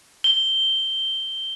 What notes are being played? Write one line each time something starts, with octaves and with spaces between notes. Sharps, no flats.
G7